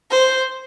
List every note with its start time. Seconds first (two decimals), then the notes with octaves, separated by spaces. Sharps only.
0.11 C5